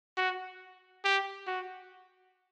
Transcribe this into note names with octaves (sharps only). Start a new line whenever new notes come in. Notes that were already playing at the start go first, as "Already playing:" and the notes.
F#4
G4
F#4